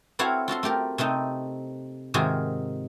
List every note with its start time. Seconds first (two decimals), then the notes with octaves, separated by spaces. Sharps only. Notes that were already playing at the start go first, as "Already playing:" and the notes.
0.19 C4 E4 F#4 A4 C#5 F5
0.48 F4 F#4 A4 C6
0.63 A3 F4 G4 A#4
0.98 C3 A3 C4 D#4
2.14 G#2 C3 D#3 F4 F#4 G#4